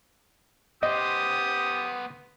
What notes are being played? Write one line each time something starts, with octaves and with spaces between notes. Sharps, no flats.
B3 G4 C5 D#5 D#6